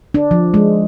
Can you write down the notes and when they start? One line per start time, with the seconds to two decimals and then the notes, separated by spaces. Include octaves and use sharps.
0.14 D4
0.31 F3
0.54 G#3